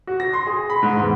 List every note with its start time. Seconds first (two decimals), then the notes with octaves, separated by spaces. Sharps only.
0.07 F#4
0.20 A#6
0.33 C6
0.47 G#4
0.70 B5
0.83 G#2
1.00 E2